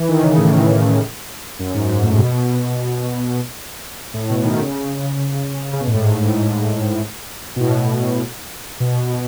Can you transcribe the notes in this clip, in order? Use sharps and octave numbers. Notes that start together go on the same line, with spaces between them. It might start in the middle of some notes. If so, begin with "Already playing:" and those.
Already playing: E3
D#3
C#3
A2
F#2
G#2
G#2
A2
B2
A2
B2
D#3
C#3
C#3
B2
A2
G#2
G#2
G#2
B2
A2
B2